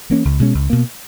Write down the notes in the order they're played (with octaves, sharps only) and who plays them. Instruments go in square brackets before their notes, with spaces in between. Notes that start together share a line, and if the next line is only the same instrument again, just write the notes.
[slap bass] E3 A#3 C#4
C#2
B2 G#3 C#4
C#2
B2 A#3